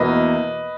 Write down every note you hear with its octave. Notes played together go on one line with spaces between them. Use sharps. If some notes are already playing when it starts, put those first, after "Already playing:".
Already playing: E2 B2 A#3 E4 B4 D#5